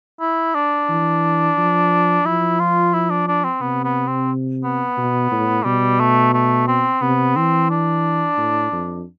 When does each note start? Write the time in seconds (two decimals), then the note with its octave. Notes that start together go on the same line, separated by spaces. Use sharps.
0.20 E4
0.54 D4
0.89 E3
1.57 F3
2.25 F3 E4
2.60 F4
2.93 E4
3.10 D4
3.28 D4
3.44 C4
3.61 C3 B3
3.85 B3
4.07 C4
4.64 B3
4.98 B2
5.32 A2
5.65 B2 G3
6.00 A3
6.34 A3
6.68 C4
7.01 C3 B3
7.36 E3 C4
7.70 D4
8.38 A2
8.72 F2